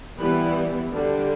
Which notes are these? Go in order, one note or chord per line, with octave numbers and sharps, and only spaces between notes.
E3 G3 B3 E4 B4
D3 G3 D4